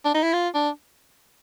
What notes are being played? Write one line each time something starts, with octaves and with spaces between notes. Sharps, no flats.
D4
D#4
E4
F4
D4